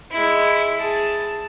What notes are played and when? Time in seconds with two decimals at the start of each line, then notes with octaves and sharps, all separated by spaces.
0.11 G#3 E4
0.77 G#4 A5